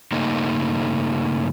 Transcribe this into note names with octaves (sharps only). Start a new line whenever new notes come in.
G2 C#3 A3 A#3 D#4 D#5